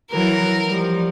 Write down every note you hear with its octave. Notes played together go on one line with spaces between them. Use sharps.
E3 F#3 A#4
F3 G3